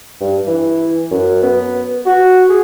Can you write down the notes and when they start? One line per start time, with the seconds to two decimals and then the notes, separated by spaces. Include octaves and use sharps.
0.20 G2
0.47 E3
1.11 F#2
1.42 B3
2.06 F#4
2.49 G#4